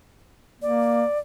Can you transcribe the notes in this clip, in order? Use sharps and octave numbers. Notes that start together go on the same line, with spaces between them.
A#3 D5